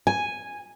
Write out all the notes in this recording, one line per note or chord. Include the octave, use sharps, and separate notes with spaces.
G#5